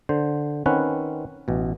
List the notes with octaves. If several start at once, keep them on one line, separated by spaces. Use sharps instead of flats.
D3 C5
D#3 C4 C#4 B4 F#5
A1 B2